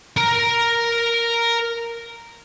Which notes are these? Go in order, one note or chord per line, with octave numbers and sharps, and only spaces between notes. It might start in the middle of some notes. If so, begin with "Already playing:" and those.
A#4 A#5